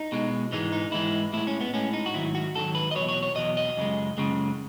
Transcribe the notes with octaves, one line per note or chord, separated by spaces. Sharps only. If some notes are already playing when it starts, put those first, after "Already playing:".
Already playing: D#4
B2 G#3
G#2 E3 G#3 D#4
D#4
G#2 E3 G#3 E4
A2 G#3 E4
C#4
B3
A2 G#3 C#4
D#4
F#4
G#2 D#3 F#3 E4
F#4
G#2 D#3 F#3 A4
B4
D#5
E2 B2 F#3 C#5
C#5
C#5
E2 B2 F#3 D#5
D#5
F#2 C#3 G#3
F#2 C#3 G#3